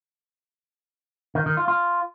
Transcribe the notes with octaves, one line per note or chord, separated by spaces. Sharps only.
D#3
D#3
F4
F4